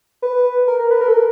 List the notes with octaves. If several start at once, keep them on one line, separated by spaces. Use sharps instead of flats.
B4
A#4
A#4
B4
A#4
A4
A#4